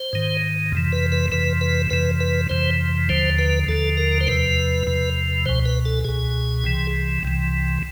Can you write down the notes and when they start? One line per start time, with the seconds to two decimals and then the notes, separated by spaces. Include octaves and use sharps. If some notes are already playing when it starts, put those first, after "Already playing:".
Already playing: C5
0.13 G#2 D#3
0.72 F2 C3 E3
0.92 B4
1.12 B4
1.32 F2 C3 E3 B4
1.61 B4
1.90 F2 C3 E3 B4
2.20 B4
2.50 F2 C3 E3 C5
3.09 D#2 D3 F3 C5
3.39 B4
3.68 D#2 D3 F3 A4
3.97 A#4
4.21 C5
4.27 E2 C3 F3 B4
4.87 E2 C3 F3
5.46 C#2 B2 C5
5.66 B4
5.85 A4
6.04 C#2 B2 G#4
6.64 C2 C3 E3
7.23 C2 C3 E3